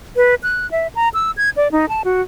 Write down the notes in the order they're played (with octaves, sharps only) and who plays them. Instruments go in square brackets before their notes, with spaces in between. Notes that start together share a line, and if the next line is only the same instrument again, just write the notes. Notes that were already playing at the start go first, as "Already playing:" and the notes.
[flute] B4
F#6
E5
A#5
E6
G#6
D5
D#4
A5
F#4